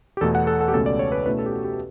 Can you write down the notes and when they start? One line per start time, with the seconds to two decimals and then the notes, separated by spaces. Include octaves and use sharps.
0.17 G4
0.21 E2 B2 A3 A4
0.35 F#5
0.47 A4
0.61 A4
0.68 G4
0.73 C#2 B2 A3 C#4 A4
0.86 D5
0.99 C#5
1.12 B4
1.25 B2 A3 C#4 E4 B4
1.39 A4
1.46 G4
1.52 F#4
1.64 G4